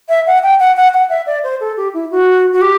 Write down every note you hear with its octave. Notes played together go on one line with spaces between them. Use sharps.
E5
F#5
G5
F#5
F#5
F#5
E5
D5
C5
A4
G4
E4
F#4
F#4
G4